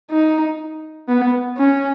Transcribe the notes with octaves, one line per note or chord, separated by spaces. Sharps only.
D#4
B3
C#4